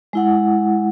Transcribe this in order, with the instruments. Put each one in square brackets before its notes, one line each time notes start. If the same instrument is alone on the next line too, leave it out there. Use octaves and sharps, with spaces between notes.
[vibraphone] G#3 E4 F#5